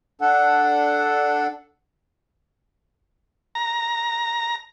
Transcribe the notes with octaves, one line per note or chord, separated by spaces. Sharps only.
D4 A4 F#5
A#5